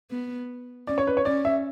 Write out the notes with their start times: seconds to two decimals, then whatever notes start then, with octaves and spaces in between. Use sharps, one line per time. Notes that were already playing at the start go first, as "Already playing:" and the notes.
0.11 B3
0.87 C#4 D5
0.98 C#5
1.07 B4
1.17 C#5
1.25 C#4 D5
1.45 E5